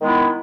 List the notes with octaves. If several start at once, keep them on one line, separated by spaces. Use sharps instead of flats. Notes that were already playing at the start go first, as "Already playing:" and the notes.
D#3 G#3 B3 E4